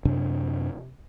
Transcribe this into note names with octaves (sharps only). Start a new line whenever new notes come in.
F#2 C3 D4